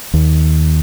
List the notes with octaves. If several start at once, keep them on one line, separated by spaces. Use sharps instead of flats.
D#2